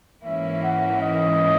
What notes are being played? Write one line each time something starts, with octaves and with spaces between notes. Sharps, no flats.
G#2 E3 A#3 C#4 E4 E5
F#5
D#5